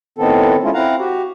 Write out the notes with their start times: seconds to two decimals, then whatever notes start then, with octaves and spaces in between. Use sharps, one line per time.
0.18 A2 D#3 B3 C4 A4
0.63 G#3 C#4 E4 F4
0.74 C4 E4 F5 F#5 A#5
0.98 F#4 G4